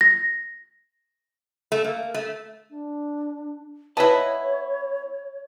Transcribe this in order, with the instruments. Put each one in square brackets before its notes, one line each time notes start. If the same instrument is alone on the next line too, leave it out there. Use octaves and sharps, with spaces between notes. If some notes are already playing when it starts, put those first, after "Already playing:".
[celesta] A#6
[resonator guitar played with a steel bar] A3
A#3
A3
[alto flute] D4
[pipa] B3 E4 [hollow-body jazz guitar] B4 D#5 A5 [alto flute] C#5